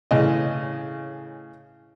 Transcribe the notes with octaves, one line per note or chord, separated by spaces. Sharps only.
A2 C#3 E3 D#5